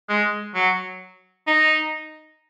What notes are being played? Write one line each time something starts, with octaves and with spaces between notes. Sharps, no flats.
G#3
F#3
D#4